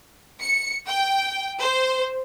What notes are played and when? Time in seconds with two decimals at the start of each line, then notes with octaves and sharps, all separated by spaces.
0.41 C#7
0.88 G5
1.60 C5